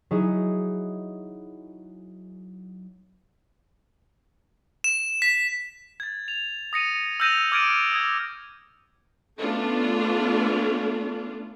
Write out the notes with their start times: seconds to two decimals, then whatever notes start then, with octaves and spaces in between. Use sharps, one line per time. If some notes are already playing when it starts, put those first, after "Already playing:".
0.11 F#3 D#4 E4 G#4 E5
4.84 E7
5.22 B6
6.00 G#6 A6
6.28 F7
6.73 D#6 A#6 C#7 D#7
7.20 E6 F6 G6 A#6 D#7 F7
7.52 D6 F6 G#6 A6 D7 D#7
7.92 D#6 G#6
9.39 A3 B3 C#4 D4 F4 A4